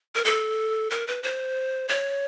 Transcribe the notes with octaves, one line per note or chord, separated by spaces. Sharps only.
A#4
A4
A#4
B4
C5
C#5